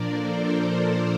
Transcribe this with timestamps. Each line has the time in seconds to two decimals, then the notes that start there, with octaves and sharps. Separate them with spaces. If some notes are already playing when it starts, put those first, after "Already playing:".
Already playing: A#2 F3 A#3 D4 A#4 D5
0.09 A4 C5